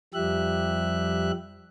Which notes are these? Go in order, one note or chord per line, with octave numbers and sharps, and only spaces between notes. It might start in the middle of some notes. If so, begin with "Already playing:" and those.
F2 F3 G3 G4 E5 F#6